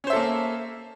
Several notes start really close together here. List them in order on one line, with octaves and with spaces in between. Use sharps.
C#4 C5 E5 A4 A#3